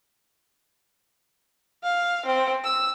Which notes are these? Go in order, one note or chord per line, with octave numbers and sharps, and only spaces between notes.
F5
C4
E6